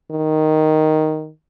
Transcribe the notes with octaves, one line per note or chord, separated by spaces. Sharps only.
D#3